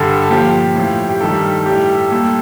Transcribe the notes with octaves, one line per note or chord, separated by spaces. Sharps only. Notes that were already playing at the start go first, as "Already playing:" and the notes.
Already playing: G2 D3 G3 A4
A#2 F3 G4
A2 F3
G4
G2 D#3 G3 A4
A2 G3 G4
A4
A#2 G3 A4